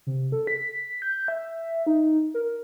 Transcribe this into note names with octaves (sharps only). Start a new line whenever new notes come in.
C3
A4
B6
G6
E5
D#4
A#4